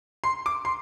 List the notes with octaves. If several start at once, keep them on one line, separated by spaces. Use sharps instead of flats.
C6
D6
C6